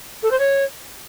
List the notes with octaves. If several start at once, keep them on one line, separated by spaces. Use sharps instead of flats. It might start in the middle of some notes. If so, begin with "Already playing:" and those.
A4
C5
C#5